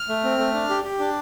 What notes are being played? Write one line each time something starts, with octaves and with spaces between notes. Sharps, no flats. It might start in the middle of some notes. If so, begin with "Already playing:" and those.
Already playing: F6
A3
C4
A3
D4
G4
G4
D4